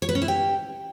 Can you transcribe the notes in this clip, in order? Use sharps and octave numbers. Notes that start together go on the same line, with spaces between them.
C#5
B4
C#4
E4
G4